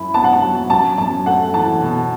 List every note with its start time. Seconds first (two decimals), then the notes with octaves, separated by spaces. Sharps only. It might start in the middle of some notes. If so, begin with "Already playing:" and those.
Already playing: F#2 E4 B5
0.14 B3 A5
0.24 F#5
0.33 A5
0.43 F#3
0.70 F#2 A5
0.98 F#2 A5
1.26 A3 F#5
1.54 E3 A5
1.82 B2